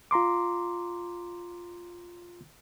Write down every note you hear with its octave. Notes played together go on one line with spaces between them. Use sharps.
F4 A#5 C6 D6